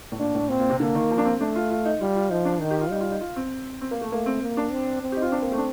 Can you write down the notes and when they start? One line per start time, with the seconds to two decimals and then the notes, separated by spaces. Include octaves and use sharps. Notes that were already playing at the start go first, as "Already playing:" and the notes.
0.12 A2
0.20 A#2 D4
0.35 A2
0.49 A#2 C4
0.60 A#2
0.70 C3
0.80 D3 A#3
0.95 D#3
1.11 F3
1.18 D4
1.25 C4
1.40 A3 D4
1.56 F4
1.70 F4
1.85 D#4
2.01 G3 F4
2.16 F4
2.30 F3 D#4
2.45 D4
2.61 D#3 D#4
2.71 G4
2.81 F4
2.91 G3 D#4
3.01 F4
3.11 D#4
3.21 F4
3.36 C4
3.81 C4
3.91 A#3
4.01 A3
4.12 A3 A#3
4.26 C4
4.42 A#3
4.57 D4
4.72 C4
5.02 C4
5.12 G4
5.17 D#4
5.22 F4
5.32 D4
5.42 A#3
5.52 A3
5.58 D4